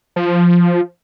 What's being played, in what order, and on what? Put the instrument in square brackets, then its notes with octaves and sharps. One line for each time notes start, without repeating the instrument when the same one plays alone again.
[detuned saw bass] F3